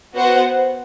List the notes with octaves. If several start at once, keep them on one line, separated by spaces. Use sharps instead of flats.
B3 F#4 C5 F#5